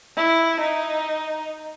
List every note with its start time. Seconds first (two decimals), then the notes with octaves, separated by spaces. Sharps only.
0.16 E4
0.61 D#4